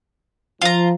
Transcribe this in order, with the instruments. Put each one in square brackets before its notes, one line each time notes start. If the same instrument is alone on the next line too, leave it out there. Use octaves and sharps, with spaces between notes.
[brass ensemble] F3 [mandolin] F4 A#5